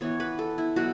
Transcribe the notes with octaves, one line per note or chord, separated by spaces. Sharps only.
E3 B3 C#5
B4
A4
E4
B2 F#3 F#4